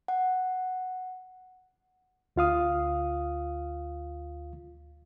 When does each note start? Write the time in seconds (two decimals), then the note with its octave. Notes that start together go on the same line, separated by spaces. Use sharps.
0.08 F#5
2.36 D2 F4 F5 D#6